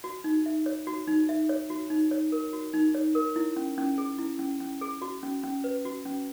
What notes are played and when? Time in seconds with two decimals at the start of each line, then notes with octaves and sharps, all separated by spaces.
0.04 F#4
0.24 D#4
0.46 E5
0.66 C#5
0.87 F#4
1.07 D#4
1.29 E5
1.49 C#5
1.70 F#4
1.90 D#4
2.11 C#5
2.32 A#4
2.53 F#4
2.74 D#4
2.95 C#5
3.15 A#4
3.36 E4
3.56 C#4
3.78 C#4
3.98 G#4
4.19 E4
4.39 C#4
4.60 C#4
4.81 G#4
5.02 F#4
5.23 C#4
5.44 C#4
5.64 B4
5.85 F#4
6.06 C#4